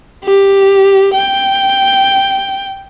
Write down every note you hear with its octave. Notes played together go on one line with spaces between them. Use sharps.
G4
G5